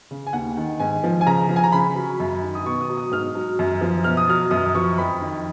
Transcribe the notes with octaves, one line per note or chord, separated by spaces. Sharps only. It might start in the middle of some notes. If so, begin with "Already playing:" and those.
C#3
G#5
D#2 F#5
D#3
G#2 G#5
F3
G#5
C#3 A#5
F3
G#5
A#5
C#3 B5
F#3
F#2
D#3
D#6
B2 C#6
D#6
F#3
D#6
G#2 F6
F#3
F#2
F3
B2 F6
D#6
F#3 F6
F#2 D#6
D#6
F3 C#6
F2 B5
D#3